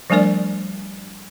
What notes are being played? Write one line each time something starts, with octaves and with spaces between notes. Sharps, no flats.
F3 G3 A3 D4 A#4 D5